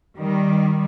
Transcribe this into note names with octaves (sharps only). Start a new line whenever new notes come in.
D#3 G3